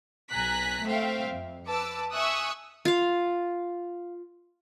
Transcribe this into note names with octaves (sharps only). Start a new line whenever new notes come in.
B1 G#5 A#5 F#6 B6
A3 C4 E5 F5 G5
F2
B4 A5 D6 E6
E5 G#5 C#6 D#6 E6 F#6
F4 F5